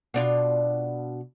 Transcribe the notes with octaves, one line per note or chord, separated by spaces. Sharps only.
B2 D4 F4